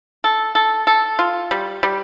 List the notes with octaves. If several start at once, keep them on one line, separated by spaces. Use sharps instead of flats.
A4
A4
A4
F4
G3
G3